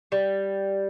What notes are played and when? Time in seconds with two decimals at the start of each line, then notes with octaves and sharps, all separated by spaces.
0.12 G3